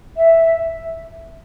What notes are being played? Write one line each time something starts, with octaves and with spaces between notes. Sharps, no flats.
E5